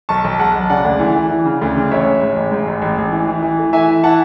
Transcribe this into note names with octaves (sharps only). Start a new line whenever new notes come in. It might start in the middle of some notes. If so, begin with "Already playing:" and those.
B1 A5 C#6
B1
G#3 F#5 A5
B1
C#3 D5 F#5
D2
E3
E3
E3
C#3
D2
C#3
A1 C#5 E5
G#3
G#2
A1
G#2
A1
A1
A1
E3
E3
E3
A3
E3 E5 G#5
E3
E3 F#5 A5